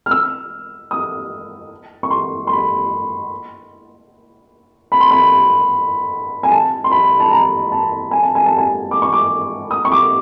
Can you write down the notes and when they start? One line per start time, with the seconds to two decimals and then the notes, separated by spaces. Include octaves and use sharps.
0.06 F6
0.11 E6
0.91 D#6
2.03 C#6
2.10 C6
2.47 C6
2.52 B5
4.92 B5
5.01 C6
5.11 B5
6.43 G#5
6.52 A5
6.84 C6
6.91 B5
7.20 A5
7.31 A#5
7.72 A5
8.11 G#5
8.23 A5
8.35 G#5
8.46 A5
8.58 G#5
8.91 D6
9.02 C#6
9.13 D6
9.71 D#6
9.85 C#6
9.92 D6